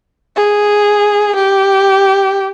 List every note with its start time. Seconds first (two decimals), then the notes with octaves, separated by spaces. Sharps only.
0.36 G#4
1.35 G4